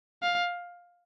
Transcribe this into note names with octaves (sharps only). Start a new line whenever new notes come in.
F5